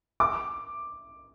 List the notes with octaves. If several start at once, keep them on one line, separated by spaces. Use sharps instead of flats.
D6